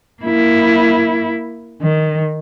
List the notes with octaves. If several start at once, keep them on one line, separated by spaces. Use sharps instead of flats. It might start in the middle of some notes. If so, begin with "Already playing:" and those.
A#3 E4
D#3